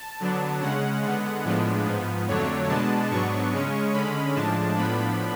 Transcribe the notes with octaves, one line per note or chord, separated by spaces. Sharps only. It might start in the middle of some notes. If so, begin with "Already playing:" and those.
Already playing: A5
D3 F#3 B3 D4
C#3 G#3 C#4 F#5
D3 G#3 B3
A2 F3 G#3 B3 D4
G#2 F3 B3
F2 D3 F#3 A3 D4 C#5
B2 G#3 B3 D4 A5
G#2 F#3 B3 D4 C#6
C#3 G#3 C#4
D3 G#3 C#4 B5
A2 F3 G#3 D4 A5
A2 F3 B3 D4 B5